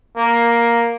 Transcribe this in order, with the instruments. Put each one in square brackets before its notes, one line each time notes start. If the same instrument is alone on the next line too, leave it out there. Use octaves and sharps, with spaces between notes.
[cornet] A#3